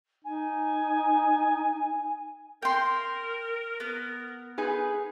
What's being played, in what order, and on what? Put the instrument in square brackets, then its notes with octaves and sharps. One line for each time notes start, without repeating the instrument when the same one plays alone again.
[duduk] D#4 [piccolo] G#5
[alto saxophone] A#4 [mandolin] G5 C6
[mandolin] B3
[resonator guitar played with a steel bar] D#4 G#4 B4